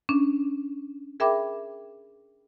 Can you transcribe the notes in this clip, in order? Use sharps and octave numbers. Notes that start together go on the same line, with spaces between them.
C#4 D4
G#4 A#4 E5 G5 B5 D6